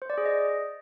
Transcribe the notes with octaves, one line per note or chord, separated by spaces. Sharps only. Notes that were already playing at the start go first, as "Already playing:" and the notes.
C5
D5
G#4
D#5